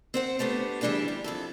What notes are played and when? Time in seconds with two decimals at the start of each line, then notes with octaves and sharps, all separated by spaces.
0.14 C4 C5 F#5
0.39 G3 A3 B3 D4
0.81 D2 E3 G3 D4 E4 G#4
1.08 G3
1.24 F2 E4 A4